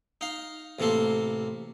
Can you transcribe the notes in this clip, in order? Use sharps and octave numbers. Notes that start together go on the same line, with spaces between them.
D#4 F5
A1 C3 A#3 A4 C6